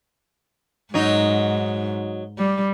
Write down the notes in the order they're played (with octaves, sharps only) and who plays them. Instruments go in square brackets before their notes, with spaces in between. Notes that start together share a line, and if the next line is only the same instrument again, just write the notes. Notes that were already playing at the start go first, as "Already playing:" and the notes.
[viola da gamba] G#2 [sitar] F#3 D#4
[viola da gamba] G3